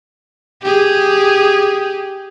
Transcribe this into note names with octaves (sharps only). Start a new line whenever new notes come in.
G4 G#4